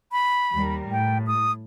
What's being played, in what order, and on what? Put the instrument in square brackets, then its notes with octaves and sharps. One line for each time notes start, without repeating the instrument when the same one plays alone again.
[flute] B5
[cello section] D#2 G3 A#4
[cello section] A2 [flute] G5
[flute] D#6